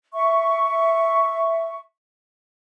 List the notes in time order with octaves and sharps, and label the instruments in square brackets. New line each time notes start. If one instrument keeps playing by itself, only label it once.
[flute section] E5 C#6